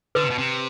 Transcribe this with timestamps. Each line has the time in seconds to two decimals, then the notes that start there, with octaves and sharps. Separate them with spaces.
0.15 D3 B4
0.23 C3
0.30 B2
0.38 C3